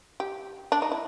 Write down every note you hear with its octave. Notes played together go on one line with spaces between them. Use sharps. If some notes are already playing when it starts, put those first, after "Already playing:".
G4
D4
D#4
E4